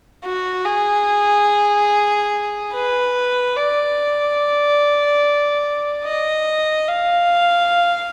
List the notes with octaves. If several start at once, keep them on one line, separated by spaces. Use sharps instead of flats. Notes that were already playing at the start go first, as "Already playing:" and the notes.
F#4
G#4
B4
D5
D#5
F5